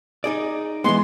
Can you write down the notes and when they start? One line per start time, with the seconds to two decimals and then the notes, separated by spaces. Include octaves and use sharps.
0.24 D#4 G#4 D5
0.84 E3 G#3 B3 C6